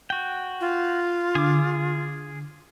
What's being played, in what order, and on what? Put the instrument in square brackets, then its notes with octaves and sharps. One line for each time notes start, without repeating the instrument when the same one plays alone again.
[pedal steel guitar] F#4 G5
[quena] F4
[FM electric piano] D3 [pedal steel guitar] G#4 D6